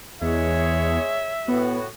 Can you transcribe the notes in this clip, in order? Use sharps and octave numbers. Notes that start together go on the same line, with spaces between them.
E2 G#3 G#4 C#5 E5
A2 B3 F#4